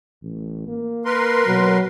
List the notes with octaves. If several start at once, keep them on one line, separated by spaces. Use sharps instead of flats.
A1
A#3
A#4 B4 C6
B2 F#3